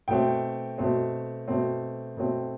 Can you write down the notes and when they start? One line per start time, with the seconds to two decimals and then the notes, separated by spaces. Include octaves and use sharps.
0.08 B2 A3 C4 G5
0.78 B2 A3 C4
1.48 B2 A3 C4
2.17 B2 A3 C4